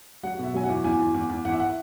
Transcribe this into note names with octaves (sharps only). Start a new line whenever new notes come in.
F#3 F#5
B2 E5
F#3 G#5
F#5
E2
E2 G#5
E2
E2
E2
E2 F#5
E5
F#5